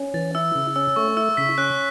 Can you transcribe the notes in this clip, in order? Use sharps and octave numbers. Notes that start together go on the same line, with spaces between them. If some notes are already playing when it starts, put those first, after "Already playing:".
Already playing: C#4
E3 A6
E4 E6
C#3
C#4 E6
A3 C#6
E4 E6
C#3 B6
C#4 F#6